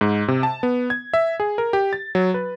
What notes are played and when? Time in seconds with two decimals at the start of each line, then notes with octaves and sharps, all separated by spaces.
0.01 G#2
0.28 C3
0.43 A5
0.63 B3
0.90 G#6
1.14 E5
1.40 G#4
1.58 A#4
1.73 G4
1.93 A6
2.15 F#3
2.34 B4